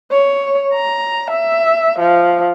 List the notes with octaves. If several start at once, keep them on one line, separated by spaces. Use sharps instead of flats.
C#5
A#5
E5
F3